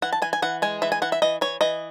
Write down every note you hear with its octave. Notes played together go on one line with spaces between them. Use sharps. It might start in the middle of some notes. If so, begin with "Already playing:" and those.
E3 F#5
A5
E3 G#5
G#5
E3 F#5
G#3 G#5
E3 E5
G#5
E3 F#5
E5
E3 D#5
E3 C#5
E3 D#5